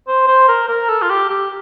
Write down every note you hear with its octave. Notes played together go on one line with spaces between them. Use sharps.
C5
C5
A#4
A#4
A4
F4
G4
G4